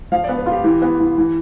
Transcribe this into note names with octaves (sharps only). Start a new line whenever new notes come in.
F3 F5
B3 D5
B4
F4
G4
E3 G4
B3
E3
E3